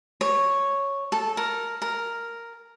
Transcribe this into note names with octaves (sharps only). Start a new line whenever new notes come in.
C#5
A4
A#4
A#4